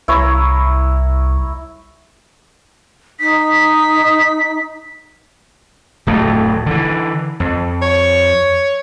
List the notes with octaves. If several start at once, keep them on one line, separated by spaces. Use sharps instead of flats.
C2 E4 C#5 A#5
D#4 B6
D1 F2 A3
D3 E3
F2
C#5